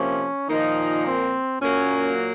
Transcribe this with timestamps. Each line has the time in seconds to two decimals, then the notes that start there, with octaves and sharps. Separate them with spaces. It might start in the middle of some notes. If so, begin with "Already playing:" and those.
Already playing: C3 F3 A#3 C#4
0.49 A#2 D#3 F3 A#3 D#4
1.06 C4
1.61 A#2 F#3 A#3 C#4